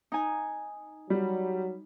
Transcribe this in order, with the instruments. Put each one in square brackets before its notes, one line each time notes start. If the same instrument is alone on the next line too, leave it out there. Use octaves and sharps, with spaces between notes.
[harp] D#4 G#5
[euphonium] F#3 [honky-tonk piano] G3